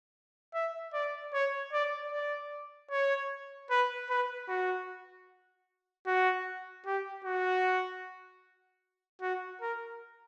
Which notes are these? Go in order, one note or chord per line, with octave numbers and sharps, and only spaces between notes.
E5
D5
C#5
D5
D5
C#5
B4
B4
F#4
F#4
G4
F#4
F#4
A#4